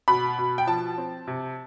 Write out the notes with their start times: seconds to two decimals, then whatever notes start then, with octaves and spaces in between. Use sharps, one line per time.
0.08 B2 B5
0.38 B2
0.58 G5
0.67 F3 A5
0.98 C4
1.27 C3